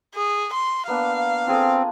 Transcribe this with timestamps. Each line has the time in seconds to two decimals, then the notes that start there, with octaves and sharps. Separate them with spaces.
0.14 G#4
0.53 C6
0.87 A#3 B3 D4 F5
1.47 C4 F4 G#4 A4